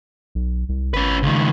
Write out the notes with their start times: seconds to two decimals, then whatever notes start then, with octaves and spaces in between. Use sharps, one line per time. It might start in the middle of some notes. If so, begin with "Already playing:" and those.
0.35 B1
0.69 C2
0.94 G#1 C#4 B4
1.23 C#2 D#3